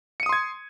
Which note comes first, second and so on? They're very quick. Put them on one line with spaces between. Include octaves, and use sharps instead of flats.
C#7 D#7 D#6 C6 G#6